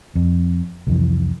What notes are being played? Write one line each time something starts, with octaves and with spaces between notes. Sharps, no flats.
F2
C2 F2 E3